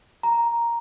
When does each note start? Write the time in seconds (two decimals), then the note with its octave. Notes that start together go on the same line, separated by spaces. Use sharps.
0.23 A#5